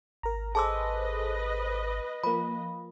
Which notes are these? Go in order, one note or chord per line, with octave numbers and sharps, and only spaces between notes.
G#1 A#4 A#5
G#4 A4 B4 C5 D#5 A5 D6 E6
F3 A#3 B5